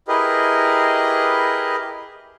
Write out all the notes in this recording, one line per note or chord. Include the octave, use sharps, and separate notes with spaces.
E4 G4 G#4 A#4 B4 D#5